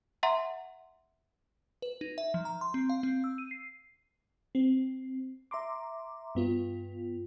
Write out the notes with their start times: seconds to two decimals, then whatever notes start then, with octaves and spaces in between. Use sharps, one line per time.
0.23 E5 F#5 A#5 C6
1.82 B4
2.01 D#4
2.18 E5
2.34 F3
2.45 A#5
2.61 C6
2.74 C4
2.89 F5
3.03 C4
3.24 E6
3.38 D#7
3.51 C7
4.55 C4
5.51 E5 A#5 C6 D6
6.35 G2 B3 F4